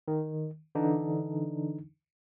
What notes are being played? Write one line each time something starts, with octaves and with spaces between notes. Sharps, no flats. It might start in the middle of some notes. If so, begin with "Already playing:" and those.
D#3
D3 E3 D4 D#4